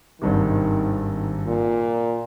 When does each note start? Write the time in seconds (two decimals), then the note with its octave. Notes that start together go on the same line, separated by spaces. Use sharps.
0.21 G#1 G2 C3 D#3
1.46 A#2